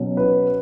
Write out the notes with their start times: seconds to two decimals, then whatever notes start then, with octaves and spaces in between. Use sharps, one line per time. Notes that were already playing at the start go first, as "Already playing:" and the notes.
Already playing: B2 F#3 C#4
0.17 B4